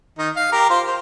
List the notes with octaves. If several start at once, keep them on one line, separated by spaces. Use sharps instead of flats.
D#3 D#4
F5
G4 A#4
F4 C5
C5